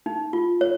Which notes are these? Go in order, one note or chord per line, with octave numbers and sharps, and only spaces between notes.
D#4
F4
C#5